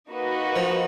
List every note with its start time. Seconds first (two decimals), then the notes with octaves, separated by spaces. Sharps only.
0.10 A#3 D#4 F#4 B4 D#5
0.56 F3